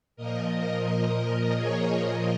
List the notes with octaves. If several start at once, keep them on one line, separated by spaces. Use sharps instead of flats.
A#2 F3 A#4 D#5
A#4 D#5
G#4 C#5
A#2 F3 A#4 D#5